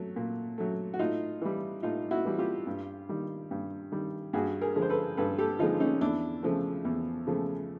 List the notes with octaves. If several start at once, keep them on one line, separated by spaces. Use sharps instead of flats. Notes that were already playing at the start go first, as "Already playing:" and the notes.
Already playing: F#3 A3
A#2
F#3 A3
F#4
A2 D#4 F4
E3 G3
A2 D#4 F4
E4 F#4
E3 G3
F4 G4
G2
D#3 G3
G2
D#3 G3
G2 F#4 G#4
G#4 A#4
D3 F3 G#3
C5
A4 B4
G2 A4 B4
G4 A4
D3 F3 G#3 D#4 F4
C#4 D#4
E2 D4 E4
C#3 F3 A3
E2
C#3 F3 A3